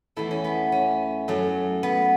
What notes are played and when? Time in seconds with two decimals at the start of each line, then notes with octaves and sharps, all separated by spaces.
0.16 E2 E3 A3 E4
0.31 C#4
0.44 B3
0.72 C#4
1.28 F#2 F#3 A3
1.83 B3